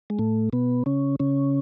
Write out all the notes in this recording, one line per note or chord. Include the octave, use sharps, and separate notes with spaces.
G#3
A2 A3
B2 B3
C#3 C#4
C#3 C#4